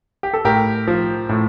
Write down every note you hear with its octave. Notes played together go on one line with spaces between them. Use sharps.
G4
A4
A2 G4 A#4
F3
A2